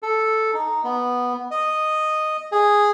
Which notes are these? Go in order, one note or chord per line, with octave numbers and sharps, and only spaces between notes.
A4
D#4
B3
D#5
G#4